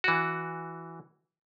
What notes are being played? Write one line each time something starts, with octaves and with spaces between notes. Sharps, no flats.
E3 F#4